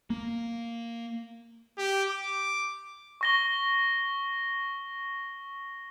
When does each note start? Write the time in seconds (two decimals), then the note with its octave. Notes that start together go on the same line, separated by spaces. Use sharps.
0.10 A#3
1.78 G4
2.10 D6
3.21 C#6 A#6 G7